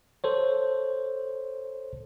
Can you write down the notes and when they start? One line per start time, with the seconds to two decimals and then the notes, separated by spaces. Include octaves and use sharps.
0.24 A4 C5 C#5